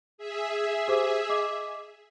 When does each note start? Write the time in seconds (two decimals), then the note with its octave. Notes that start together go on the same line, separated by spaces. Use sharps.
0.18 G#4 E5
0.88 G4 C5 D6
1.29 D#5 D6